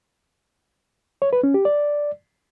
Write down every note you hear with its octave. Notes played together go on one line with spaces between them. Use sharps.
C#5
B4
C#4
G4
D5